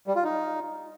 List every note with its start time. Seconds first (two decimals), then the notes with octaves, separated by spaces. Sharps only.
0.07 G3
0.16 F4
0.24 D#4